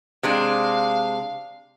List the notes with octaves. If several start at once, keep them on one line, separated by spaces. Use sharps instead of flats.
C3 G#3 D4 F5